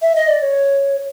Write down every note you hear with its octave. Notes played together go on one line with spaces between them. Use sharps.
E5
D#5
D5
C#5